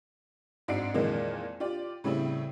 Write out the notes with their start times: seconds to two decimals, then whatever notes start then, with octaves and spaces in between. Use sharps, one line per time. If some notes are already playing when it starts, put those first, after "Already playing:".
0.68 G#2 C4 D4 F#4 C7 D7
0.94 F2 A#2 D#3 E3 G#3
1.60 F4 G4 D5
2.04 A2 C#3 G3 C4 E4